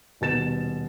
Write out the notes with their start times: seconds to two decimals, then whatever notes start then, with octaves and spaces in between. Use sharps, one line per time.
0.21 D#1 B2 A6 E7